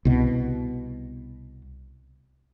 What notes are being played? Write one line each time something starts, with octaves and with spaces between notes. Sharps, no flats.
C2 B2